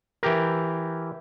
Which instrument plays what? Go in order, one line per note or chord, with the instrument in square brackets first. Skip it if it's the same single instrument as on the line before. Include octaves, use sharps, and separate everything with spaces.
[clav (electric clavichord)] E3 G4 A#4